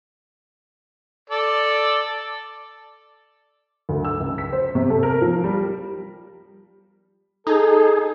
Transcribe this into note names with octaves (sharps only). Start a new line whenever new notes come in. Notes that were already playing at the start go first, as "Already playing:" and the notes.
A4 D5
D2
E6
C#2
B6
C5
C3
A4
A#4
F3
G3
D#4 G#4 A4